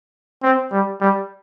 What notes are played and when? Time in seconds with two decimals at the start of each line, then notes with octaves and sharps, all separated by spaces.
0.43 C4
0.72 G3
1.01 G3